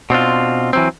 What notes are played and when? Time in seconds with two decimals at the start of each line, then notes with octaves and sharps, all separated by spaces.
0.10 B2 C4 D4 F4
0.73 E3 F#3 C4